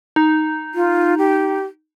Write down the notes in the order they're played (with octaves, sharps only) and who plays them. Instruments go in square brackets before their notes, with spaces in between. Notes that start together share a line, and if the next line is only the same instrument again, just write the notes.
[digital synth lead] D#4
[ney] F4
G4